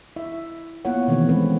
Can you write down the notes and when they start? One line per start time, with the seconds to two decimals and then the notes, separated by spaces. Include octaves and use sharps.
0.16 E4 E5
0.85 A#3 B3 E4 F4 C#5 F#5
1.08 B2 D#3 E3 A3 B3 C4
1.29 E3 G#3 C4 C#4 B4